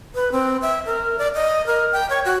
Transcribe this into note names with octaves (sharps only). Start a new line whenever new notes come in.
B4
C4
E5
A#4
D5
D#5
A#4
G5
C#5
F#4